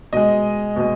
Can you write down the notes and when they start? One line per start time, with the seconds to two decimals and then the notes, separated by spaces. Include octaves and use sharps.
0.12 B2 G#3 D#5
0.76 B2 G#3